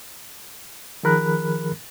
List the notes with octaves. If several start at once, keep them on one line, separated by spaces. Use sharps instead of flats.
D#3 F3 G#4 A#4 B5 F#6